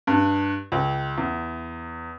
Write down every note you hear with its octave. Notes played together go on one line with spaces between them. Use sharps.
G2
C#2
E2